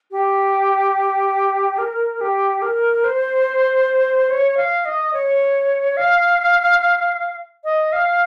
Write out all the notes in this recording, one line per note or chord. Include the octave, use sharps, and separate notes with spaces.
G4
A#4
G4
A#4
C5
C#5
F5
D#5
C#5
F5
D#5
F5